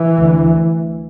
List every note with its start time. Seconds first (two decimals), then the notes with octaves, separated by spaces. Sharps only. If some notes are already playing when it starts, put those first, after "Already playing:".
Already playing: E3
0.18 D2